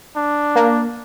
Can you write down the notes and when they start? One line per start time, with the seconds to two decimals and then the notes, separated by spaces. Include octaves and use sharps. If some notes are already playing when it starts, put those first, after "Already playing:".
0.16 D4
0.56 A#3